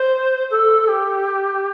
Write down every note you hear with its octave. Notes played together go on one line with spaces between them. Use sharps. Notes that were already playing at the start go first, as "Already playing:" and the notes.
Already playing: C5
A4
G4